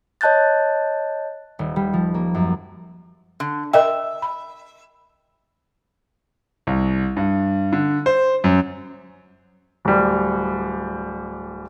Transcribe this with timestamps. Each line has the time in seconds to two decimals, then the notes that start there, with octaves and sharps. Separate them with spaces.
0.21 C#5 D#5 A5 F#6 G6 A6
1.59 D#1
1.76 G3
1.93 F3
2.14 A#3
2.34 F#2
3.40 D3
3.73 A#4 D#5 E5 G5
4.22 B5
6.67 C2
7.17 G2
7.73 D3
8.06 C5
8.44 F#2
9.85 D1 G3